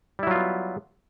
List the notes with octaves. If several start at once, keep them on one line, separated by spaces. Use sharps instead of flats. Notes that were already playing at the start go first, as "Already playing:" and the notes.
F#3 G3 B3 E4 F4